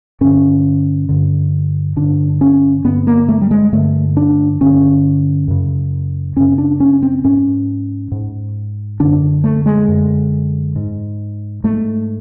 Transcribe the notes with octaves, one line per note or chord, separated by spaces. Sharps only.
G2 D3 C#4
G2 D3
G2 D3 D4
C#4
G2 D3 B3
A#3
A3
G3
G#3
G2 D3 A3
D4
G2 D3 C#4
F#2 C#3
F#2 C#3 C#4
D4
C#4
C4
G#2 C#4
G#2
F#2 D3 D4
A3
G#3
F#2 D3
G#2
G#2 A3